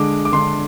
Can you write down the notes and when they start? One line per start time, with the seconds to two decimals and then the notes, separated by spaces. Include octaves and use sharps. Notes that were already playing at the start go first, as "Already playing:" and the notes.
Already playing: D3 G#3 D4 D6
0.25 D6
0.32 D3 G#3 D4 C6